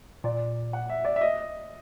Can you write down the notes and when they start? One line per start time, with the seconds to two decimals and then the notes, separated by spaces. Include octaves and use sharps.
0.24 A#2 D5
0.73 F#5
0.90 E5
1.05 D5
1.16 E5
1.21 D#5